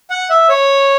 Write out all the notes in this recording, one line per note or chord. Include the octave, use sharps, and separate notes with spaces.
F#5
E5
C#5